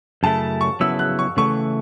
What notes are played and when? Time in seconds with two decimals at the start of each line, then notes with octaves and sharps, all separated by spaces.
0.23 F#2 C#3 A3 E4 A5
0.61 C#6
0.80 C#3 F#3 B3 E4 E6
0.99 F#6
1.19 C#6
1.37 C#3 E3 A3 C#6